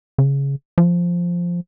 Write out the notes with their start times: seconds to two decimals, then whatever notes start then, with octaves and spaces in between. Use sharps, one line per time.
0.18 C#3
0.78 F3